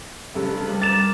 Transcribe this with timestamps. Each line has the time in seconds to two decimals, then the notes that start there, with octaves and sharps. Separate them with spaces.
0.34 F1 G2 C#3
0.65 G3 B4
0.82 A#4 D6 A6 E7